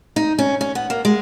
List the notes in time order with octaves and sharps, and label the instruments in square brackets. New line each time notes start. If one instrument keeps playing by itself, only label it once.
[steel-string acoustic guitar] D#4
C#4
C#4
B3
A#3
G#3